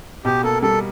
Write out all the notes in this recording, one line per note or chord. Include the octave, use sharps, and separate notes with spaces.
B2 G4
A#3 A4
G3 A4